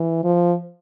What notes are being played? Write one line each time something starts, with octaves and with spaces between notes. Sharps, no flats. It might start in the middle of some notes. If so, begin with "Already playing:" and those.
Already playing: E3
F3